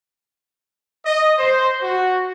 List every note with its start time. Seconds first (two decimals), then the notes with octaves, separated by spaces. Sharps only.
1.06 D#5
1.38 C5
1.82 F#4